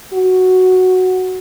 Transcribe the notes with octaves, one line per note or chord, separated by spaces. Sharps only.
F#4